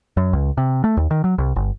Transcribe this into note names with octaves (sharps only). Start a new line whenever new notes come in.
F#2
C#2
C3
A3
D#2
D#3
F#3
C2
G1